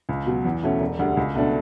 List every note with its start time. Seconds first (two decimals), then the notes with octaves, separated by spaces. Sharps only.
0.09 C#2
0.26 B2 F#3
0.44 E2
0.63 B2 A3 C#4
0.80 E1
0.99 D2 D3 G3
1.17 C#2
1.35 B2 A3 D4